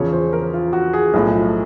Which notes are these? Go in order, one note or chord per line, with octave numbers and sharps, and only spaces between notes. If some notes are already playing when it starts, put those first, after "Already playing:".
Already playing: E2 C#3 F3 C#5
C5
A#4
F4
F#4
G#4
B1 A2 F3